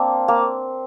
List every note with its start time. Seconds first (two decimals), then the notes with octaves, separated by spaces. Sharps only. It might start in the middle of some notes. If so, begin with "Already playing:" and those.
Already playing: A#3 C4 D4
0.28 A#3